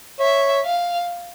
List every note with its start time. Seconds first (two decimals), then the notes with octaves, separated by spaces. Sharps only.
0.20 C#5 E5
0.66 F5